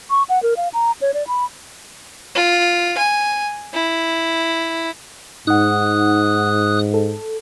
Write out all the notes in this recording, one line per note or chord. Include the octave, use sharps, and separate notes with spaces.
C#6
F#5
A#4
F5
A#5
C#5
D5
B5
F4
G#5
E4
G#2 D#4 F#5 D#6 F#6
A4